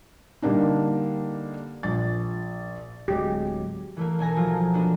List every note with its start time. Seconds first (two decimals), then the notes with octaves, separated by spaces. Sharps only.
0.42 D3 G3 A#3 D4 D#4
1.83 A#1 A6
3.08 D1 F#3 G#3 G4
3.97 E3 A3 A#3
4.19 B1 A4 G#5 A#5
4.36 F3 F#3 F4
4.73 B3 D4 F#4